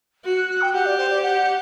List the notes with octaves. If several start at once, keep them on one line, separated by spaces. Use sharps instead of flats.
F#4
F#6
F#6
G5
G4 F#5
D5
C5
D5
F#5